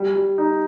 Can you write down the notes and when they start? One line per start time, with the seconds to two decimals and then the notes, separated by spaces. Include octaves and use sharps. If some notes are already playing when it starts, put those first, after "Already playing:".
Already playing: G3
0.15 G3
0.38 D#4